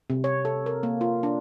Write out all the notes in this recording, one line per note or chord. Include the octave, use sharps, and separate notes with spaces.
C3
C#5
A4
A#4
A#3
F4
D4